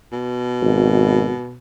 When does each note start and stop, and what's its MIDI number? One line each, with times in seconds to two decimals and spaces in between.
0.12 1.58 47
0.61 1.32 32